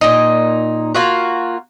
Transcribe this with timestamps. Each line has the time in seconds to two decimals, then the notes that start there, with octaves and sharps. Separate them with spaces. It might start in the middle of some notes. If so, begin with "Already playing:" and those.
0.01 A#2 D#4
0.95 A#3 F4 F#4